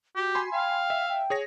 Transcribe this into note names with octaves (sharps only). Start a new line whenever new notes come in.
F#4 G4
G#5 B5 C6
F5 G5
E5
G5
G#4 C#5 A#6